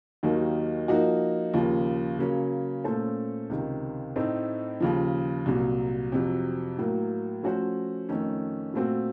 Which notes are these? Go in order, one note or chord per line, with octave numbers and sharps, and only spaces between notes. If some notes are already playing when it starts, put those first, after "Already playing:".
D#2 D#3 F#3 A#3 D#4
F3 A#3 D#4 F#4
D#2 C#3 F3 A#3 F4
C#3 F#3 A#3 C#4
A#2 A3 C#4 A4 C5
C#2 C3 D#3
A2 A3 C4 D#4
D#2 C#3 F3
C2 A#2 F#3
F2 C3 F#3
A2 F#3 A#3
F3 A3 C#4 F#4 C5
F2 D#3 A3 C#4
A#2 A3 C4 F#4